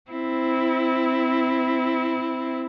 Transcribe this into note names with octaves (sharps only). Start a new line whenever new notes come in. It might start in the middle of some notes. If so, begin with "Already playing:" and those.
C4 E4